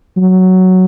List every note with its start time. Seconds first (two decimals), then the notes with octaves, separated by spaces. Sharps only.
0.17 F#3